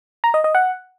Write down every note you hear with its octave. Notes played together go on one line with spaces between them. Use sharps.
A#5
D#5
D#5
F#5